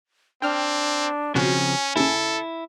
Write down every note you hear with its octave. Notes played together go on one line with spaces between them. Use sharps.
C4 D4 G5 F6
B1 C#3 F3 C4 C#4 F#4 G#5
D#2 C#3 E4 A4